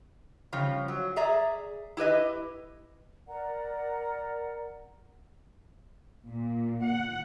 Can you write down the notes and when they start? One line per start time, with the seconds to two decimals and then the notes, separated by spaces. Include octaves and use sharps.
0.53 C#3 F3 G3
0.88 F#3
1.16 G#4 D5 E5 A#5
1.97 E4 G4 B4 D#5
3.27 A#4 D5 F#5 A#5
6.26 A#2
6.83 F#5